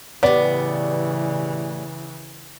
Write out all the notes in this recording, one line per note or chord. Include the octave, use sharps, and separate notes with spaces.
A2 C#3 E3 G3 B3 D5